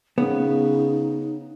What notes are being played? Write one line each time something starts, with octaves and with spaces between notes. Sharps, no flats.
C#3 B3 D#4